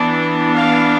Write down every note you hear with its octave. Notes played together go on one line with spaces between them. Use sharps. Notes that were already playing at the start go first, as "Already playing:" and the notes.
Already playing: E3 B3 D4
F5